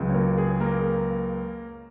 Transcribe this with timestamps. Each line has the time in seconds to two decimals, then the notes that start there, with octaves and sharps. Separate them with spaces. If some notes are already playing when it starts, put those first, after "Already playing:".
Already playing: C#2 C#3 F#3
0.09 C#5
0.14 A#3 A#4
0.38 G#4
0.60 A#3 A#4